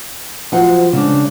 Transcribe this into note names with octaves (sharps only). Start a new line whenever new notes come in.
F3 F#3 C5 F#5
C#3 G#3 D4